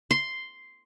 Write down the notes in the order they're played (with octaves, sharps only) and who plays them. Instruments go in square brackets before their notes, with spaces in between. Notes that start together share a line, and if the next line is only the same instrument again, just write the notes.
[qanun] C6